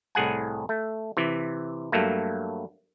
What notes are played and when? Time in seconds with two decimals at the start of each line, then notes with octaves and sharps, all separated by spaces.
0.15 C2 A2 G#4 F#5 G#5
0.69 A3
1.17 C3 E3
1.92 G2 F#3 A3 A#3